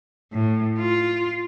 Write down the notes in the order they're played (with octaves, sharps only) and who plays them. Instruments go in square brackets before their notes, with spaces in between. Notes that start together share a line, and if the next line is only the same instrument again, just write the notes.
[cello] A2
F4